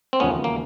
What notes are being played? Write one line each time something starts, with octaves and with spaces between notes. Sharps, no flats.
C4
E1 D#2 C#3 F3 A3 B3 C#4
A#3